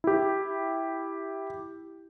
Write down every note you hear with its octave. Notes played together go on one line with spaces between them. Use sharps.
E4 G4